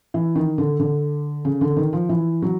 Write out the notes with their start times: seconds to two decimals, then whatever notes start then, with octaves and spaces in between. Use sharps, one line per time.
0.14 E3
0.35 D#3
0.58 D3
0.80 D3
1.45 C#3
1.61 D3
1.77 D#3
1.93 F3
2.09 E3
2.42 F#3